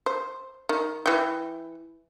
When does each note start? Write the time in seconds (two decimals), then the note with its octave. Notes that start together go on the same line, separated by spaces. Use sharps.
0.06 C5
0.69 D#3
1.06 E3 G5